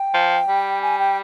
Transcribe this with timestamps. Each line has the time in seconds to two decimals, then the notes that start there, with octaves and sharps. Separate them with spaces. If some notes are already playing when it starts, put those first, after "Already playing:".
Already playing: G5
0.14 F3
0.48 G3
0.82 G#5
0.99 G5